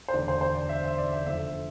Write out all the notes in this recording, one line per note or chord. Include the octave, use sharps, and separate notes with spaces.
C5
E1 D2 D3 D5
C5
C5
D5
E5
E5
D5
E5
F1 F2 D3 E5